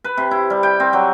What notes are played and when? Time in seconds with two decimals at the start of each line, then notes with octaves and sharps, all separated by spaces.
0.04 B4
0.17 C3
0.31 E4
0.50 G3
0.63 G5
0.80 C4
0.93 F#3